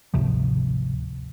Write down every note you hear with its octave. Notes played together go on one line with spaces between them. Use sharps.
G#1 D2 C3 F3